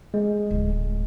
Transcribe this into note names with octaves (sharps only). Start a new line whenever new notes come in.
G#3
D1 A2